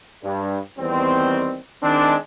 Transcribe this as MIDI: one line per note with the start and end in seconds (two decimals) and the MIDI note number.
0.24 0.58 43
0.79 1.58 40
0.79 1.58 51
0.79 1.58 55
0.79 1.58 60
1.83 2.15 51
1.83 2.15 56
1.83 2.15 60
1.83 2.15 62